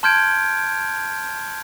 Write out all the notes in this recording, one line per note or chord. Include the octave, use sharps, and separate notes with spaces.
A5 C6 F6 G6 G#6 D7